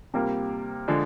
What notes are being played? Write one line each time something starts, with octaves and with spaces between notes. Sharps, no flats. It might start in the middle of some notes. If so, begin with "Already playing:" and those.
C3 G3 A#3 F4 A#4
D3 F3 G#3 D4 G#4